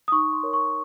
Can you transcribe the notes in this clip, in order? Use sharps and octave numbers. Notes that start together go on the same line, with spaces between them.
D#6
D#4 C#6
C6
A#4 C#5
C#6